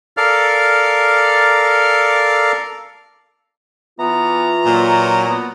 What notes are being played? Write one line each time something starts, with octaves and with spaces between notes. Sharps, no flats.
A4 A#4 D5 F5 F6
E3 B3 F4 A#5
A#2 F#3
B3